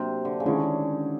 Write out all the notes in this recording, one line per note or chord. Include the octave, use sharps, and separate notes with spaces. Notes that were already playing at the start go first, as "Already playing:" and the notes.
Already playing: C3 F#3 A#3 D4 G4
D3
C#3
D3 D#3 G#3 C#4 E4 G#4